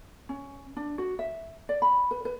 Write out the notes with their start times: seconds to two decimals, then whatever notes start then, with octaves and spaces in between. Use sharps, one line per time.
0.29 C#4
0.76 D4
0.98 F#4
1.19 E5
1.69 D5
1.82 B5
2.11 B4
2.25 B4